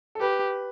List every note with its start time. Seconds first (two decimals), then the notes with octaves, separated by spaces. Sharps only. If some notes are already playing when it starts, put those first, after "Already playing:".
0.15 A4
0.20 G4 B4